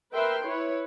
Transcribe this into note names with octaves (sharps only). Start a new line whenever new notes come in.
A#4 B4 E5 G5 C6
E4 B4 C#5